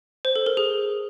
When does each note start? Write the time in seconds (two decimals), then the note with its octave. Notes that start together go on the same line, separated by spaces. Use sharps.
0.25 C5
0.36 A4
0.46 A#4
0.57 G#4